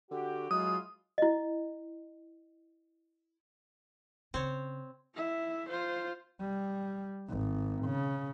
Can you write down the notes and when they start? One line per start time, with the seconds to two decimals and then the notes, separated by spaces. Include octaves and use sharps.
0.11 D3 F#4 G4
0.51 F#3 G#3 E4 F4 D#6
1.18 E4 D#5
4.34 C#3 C4 C#5
5.15 E4 E5
5.68 F4 C5
6.40 G3
7.29 G#1
7.85 C#3